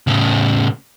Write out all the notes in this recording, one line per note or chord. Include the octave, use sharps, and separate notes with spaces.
A2 C#3